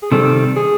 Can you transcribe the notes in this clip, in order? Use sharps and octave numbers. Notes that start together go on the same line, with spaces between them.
G#4
C3 D#3 G3 C4 A4
G#4